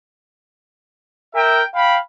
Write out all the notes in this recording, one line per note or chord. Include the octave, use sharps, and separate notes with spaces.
A#4 E5 G5
F5 G5 B5